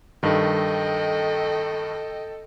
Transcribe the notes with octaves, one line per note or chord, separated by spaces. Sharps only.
G2 D#3 A4 D#5 G5